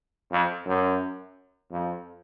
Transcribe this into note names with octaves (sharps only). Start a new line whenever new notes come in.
F2
F#2
F2